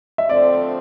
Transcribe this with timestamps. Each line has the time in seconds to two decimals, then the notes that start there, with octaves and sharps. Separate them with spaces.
0.18 E5
0.29 D3 F3 A3 C4 D5